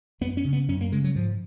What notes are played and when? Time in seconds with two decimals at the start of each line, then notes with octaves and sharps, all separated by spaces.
0.21 F#2 B3
0.37 C#4
0.44 C#3
0.53 B3
0.68 F#2 C#4
0.81 A#3
0.92 C#3 G#3
1.04 F#3
1.15 G#2 F3